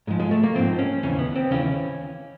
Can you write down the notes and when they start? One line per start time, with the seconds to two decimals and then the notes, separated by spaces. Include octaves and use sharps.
0.07 G#2 F3 G#3
0.20 G#3
0.31 A3
0.43 A#3
0.55 G#2 F3 C4
0.79 C#4
1.03 D#2 C#3 E3 C#4
1.19 B3
1.36 C4
1.51 D#2 C#3 E3 C#4